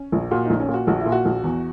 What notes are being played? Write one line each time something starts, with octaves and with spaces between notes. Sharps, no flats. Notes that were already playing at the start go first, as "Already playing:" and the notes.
Already playing: C#4
A#1
A#2 F#4
A#1 D#4
C#4
A#2
F#4
A#1 F#4
E4
A#2
F#4
A#1
E2